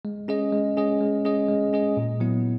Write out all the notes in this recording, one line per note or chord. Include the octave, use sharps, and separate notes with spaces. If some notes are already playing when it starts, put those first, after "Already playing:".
G#3
C#4 G#4 D#5
G#3
C#4 G#4 D#5
G#3
C#4 G#4 D#5
G#3
C#4 G#4 D#5
A#2
F#3 B3 E4